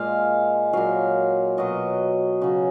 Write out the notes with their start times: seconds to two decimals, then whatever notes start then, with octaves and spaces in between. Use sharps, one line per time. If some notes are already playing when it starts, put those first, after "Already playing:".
Already playing: A#2 G#3 F5
0.73 A#2 F#3 F5
1.57 B2 F#3 D#5
2.41 C#3 F#3